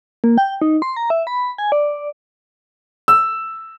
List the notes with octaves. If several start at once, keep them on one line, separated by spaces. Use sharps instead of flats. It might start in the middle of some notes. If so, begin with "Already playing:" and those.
A#3
G5
D#4
C6
A#5
E5
B5
G#5
D5
E6